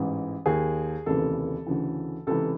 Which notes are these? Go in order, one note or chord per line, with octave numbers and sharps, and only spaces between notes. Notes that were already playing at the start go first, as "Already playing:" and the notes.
Already playing: A1 G#2 E3
D#2 D#3 G#4
F1 D#2 C#3 E3 A4
D2 C#3 E3
C#2 C3 E3 A4